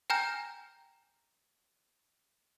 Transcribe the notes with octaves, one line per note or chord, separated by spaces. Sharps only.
G5 G#5 A#5 F6 G6 A#6